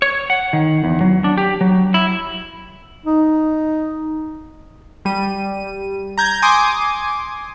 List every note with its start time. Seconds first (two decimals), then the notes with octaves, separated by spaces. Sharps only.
0.02 C#5
0.30 F#5
0.53 D#3
0.84 E2
1.01 F#3
1.24 D4
1.38 G4
1.61 F#3
1.94 E4
3.06 D#4
5.05 G3 D#7
6.18 A#5 G6 G#6
6.42 G#5 C6 D6 D#6